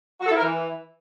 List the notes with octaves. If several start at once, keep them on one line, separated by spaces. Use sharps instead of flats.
F#4
A4
E4
A#4
E3